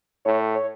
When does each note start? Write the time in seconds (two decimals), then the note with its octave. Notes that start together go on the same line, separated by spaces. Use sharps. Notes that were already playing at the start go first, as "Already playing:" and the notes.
0.25 A2 C#5
0.55 C#5